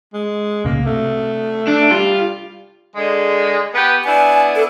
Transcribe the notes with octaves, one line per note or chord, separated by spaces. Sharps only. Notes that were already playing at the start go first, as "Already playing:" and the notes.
G#3
C2 A2 C#3 A#3
C3 A3
D4
G3 F4
D3 G#3
B3 G4 B4
B3 D4 E4 G#5
A4